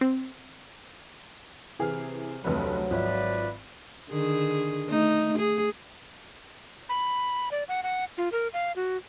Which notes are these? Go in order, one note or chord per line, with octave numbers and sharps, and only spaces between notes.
C4
C3 E3 G#4 F6
F1 D2 C3 F#3 A4 B4
G#1 F3 B4 D5 E5
D3 D#3 G#4
A3 D#4
G#4
B5
D5
F#5
F#5
F4
A#4
F5
F#4